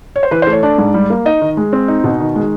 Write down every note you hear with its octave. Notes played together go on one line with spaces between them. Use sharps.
C#5
C5
E3 B4
C5
A3
C#5
D4 D5
G#2
G3
A#3
D#4 D#5
D#3
G#3
C4
D#4
B2
D#3
G#3